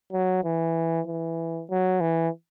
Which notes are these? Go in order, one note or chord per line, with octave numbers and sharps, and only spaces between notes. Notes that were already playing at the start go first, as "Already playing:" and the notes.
F#3
E3
E3
F#3
E3